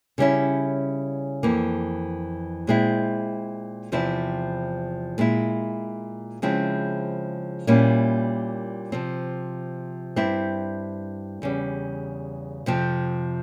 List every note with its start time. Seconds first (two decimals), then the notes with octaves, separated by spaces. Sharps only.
0.18 C#3 G3 C#4 E4
1.43 F2 E3 A#3
2.67 A#2 G#3 C4 E4
3.92 E2 C3 F3 C4 E4
5.18 A#2 G#3 E4
6.42 C#3 F3 G#3 C4 E4
7.67 A#2 G3 A#3 C#4 E4
8.92 C3 F3 C4
10.16 G2 G3 C4 E4
11.42 E2 C#3 G3
12.66 F2 C3 F3 C4